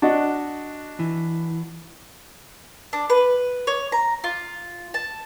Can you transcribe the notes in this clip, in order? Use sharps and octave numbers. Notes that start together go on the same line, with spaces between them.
D4 F#4 D#5
E3
D4
B4
C#5
A#5
F4
A5